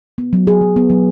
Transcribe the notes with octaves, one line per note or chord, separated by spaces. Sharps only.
B3
F#3
G#4
F#3
B3
F#3